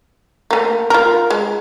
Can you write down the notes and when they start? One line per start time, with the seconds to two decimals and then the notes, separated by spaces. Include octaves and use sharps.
0.51 A3 A#3
0.90 F4 A#4
1.30 G#3